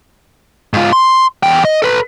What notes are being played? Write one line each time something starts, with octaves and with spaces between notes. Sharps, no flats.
G#2 F4
C6
E2 G5
D#5
A4 B4